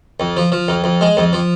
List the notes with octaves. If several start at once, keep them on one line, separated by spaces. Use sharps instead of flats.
F2
F3
F3
F2
F2
G#3
F2
F3